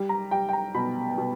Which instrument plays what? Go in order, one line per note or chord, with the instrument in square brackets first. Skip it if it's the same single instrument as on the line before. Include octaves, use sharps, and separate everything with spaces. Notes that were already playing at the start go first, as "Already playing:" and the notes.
Already playing: [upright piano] G3
A#5
G3 G5
G5
A#5
B2 B5
B2